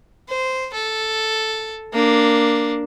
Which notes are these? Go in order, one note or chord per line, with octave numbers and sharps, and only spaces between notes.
C5
A4
A#3 D4